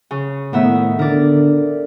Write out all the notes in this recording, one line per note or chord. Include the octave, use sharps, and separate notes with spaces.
C#3
A2 D#3 B3 E5
D3 A#4 D5